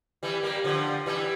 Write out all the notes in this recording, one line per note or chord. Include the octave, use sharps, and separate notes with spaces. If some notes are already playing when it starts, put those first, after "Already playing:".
E3 G3
G3 A#3
D3 F3
E3 G3